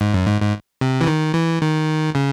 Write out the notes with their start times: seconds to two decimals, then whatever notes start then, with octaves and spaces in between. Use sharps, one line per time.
0.01 G#2
0.14 F#2
0.27 G#2
0.41 G#2
0.81 C3
1.01 E3
1.07 D#3
1.34 E3
1.62 D#3
2.15 C#3